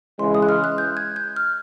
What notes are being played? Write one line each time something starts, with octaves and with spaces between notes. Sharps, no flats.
C#3 E3 G#3 C6
D#6
F#6
F6
F#6
G6
G#6
G6
F6